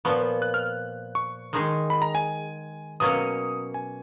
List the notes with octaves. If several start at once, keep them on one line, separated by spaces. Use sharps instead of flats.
A#2 F3 B3 C#6
F#6
F6
C#6
D#3 G#3 D#4 G#4
B5
A#5
G#5
B2 F#3 A#3 C#4 D#6
G#5